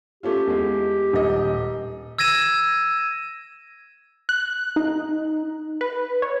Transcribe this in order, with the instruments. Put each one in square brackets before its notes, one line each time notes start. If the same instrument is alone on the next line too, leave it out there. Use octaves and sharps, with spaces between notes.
[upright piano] A3 C#4 F4 [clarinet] G4
[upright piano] E2 G#3
D#1 D#5
[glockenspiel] E6 G#6 A#6 D#7 E7
[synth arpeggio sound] F#6
D#4
B4
C#5